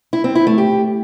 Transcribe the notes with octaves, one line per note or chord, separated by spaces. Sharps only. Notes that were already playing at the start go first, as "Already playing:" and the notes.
E4
C4
E4
A3
G4